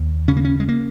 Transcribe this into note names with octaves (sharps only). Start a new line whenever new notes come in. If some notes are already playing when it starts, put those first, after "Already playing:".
Already playing: D#2
C#3 C#4
A#3
C#4
G#3
A#3